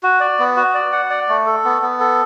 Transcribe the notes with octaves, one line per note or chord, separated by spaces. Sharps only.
F#4
D5
B3
F#4
D5
F#5
D5
A3
A4
B3
B3
A4